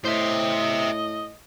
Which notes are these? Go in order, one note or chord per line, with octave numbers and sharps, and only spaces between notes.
A2 C5 D#5 E5